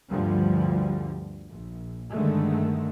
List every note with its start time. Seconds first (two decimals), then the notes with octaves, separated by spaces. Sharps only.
0.11 D2 G2 D3 F3 G3
1.50 A#1
2.12 G2 D3 D#3 G#3 A3